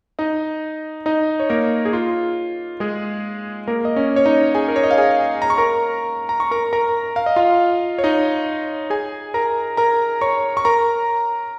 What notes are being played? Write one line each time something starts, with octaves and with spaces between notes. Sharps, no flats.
D#4 D#5
D#4 D#5
C#5
A#3 A#4
G#4
F4
G#3 G#4
A#3 A#4
D#5
C#4 C#5
C#5
D#4 D#5
G#4 G#5
A#4
C#5
D#5
F5
G#4 G#5
A#5
C#6
A#4 A#5
A#5
C#6
A#4 A#5
A#4 A#5
F5
D#5
F4 F5
C#5
D#4 D#5
G#4 G#5
A#4 A#5
A#4 A#5
C#5 C#6
C#6
A#4 A#5